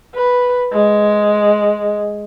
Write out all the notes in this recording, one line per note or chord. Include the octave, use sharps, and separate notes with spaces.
B4
G#3